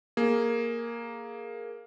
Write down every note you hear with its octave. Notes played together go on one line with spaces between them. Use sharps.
A#3 G#4